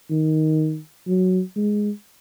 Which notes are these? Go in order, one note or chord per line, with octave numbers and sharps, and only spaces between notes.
D#3
F#3
G#3